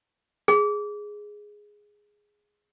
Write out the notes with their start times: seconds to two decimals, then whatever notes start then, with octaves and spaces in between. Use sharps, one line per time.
0.48 G#4